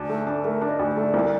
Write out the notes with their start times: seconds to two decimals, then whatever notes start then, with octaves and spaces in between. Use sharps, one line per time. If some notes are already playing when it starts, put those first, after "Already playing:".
Already playing: D2 D4
0.09 A3
0.27 D4
0.33 A4
0.44 A3 A#4
0.61 D4
0.69 D#5
0.79 D2 D5
0.97 A3
1.14 C2